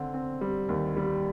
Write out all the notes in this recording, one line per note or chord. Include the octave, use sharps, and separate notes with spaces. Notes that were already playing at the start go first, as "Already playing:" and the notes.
Already playing: D3 C4
C4
G3
D#2
G3